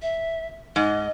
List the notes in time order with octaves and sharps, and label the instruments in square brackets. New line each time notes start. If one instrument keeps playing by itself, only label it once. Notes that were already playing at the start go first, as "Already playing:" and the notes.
[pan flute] E5
[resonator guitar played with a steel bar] G#2 [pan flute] D#5